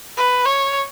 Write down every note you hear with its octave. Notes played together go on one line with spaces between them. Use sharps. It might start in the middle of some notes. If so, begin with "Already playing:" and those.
B4
C#5